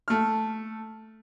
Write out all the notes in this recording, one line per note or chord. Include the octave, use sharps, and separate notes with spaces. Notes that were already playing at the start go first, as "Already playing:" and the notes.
A3 F6